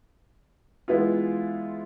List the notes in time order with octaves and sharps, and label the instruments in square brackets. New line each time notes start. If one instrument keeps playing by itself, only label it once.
[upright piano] E3 G#3 B3 E4 F4